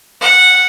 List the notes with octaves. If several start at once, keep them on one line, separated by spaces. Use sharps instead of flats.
F#5